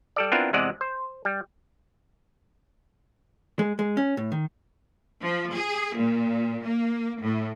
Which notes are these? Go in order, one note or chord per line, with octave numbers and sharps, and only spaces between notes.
G3 A4 D5
B3 C4 D4 E4 F4 A#4
E2 C3 G#3 D5 F#5
C5
G3
G#3
G#3
C#4
A2
D#3
F3
G#4
A#2
A#3
A2